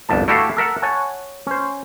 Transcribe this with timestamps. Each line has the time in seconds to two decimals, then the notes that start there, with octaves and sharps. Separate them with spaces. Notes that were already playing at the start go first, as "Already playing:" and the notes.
0.09 G1 C2 F2 A5
0.28 A3 E4 F#4 G4 A4 F5
0.57 A4 A#4 E5 F#5
0.82 C#5 F#5 G#5 A5
1.47 C#4 C5